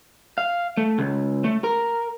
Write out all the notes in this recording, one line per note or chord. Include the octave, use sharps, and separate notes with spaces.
F5
A3
C#2
A3
A#4